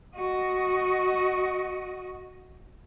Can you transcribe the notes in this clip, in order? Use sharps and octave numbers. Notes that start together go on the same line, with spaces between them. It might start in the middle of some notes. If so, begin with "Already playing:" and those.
F#4 D#5